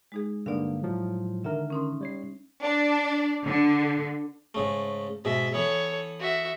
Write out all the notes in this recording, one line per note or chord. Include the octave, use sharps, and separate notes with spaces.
G#3 D#4 G#4
G2 D3 A#3 D#4 D5 F5
A2 F3 F#3
D3 D#3 A#4 E5
C#4 D#4 C6
G3 C#5 C7
D4
D3
G#2 C#3 A3
G#2 B2 E5
E3 B3 A4 C#5
F#4 E5